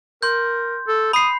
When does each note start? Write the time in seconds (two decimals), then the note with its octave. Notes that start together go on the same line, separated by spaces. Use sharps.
0.23 A#4 C6 G6
0.88 A4
1.13 B5 D#6 C7